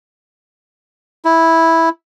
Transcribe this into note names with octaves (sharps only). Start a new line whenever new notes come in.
E4